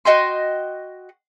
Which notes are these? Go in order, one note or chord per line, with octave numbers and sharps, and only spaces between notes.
F#4 D#5 G5 C6